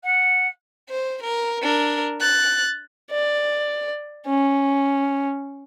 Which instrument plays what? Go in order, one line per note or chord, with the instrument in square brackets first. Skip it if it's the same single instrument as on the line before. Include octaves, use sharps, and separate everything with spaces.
[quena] F#5
[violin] C5
A#4
D4 A#4
F#6 A6
[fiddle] D5
C#4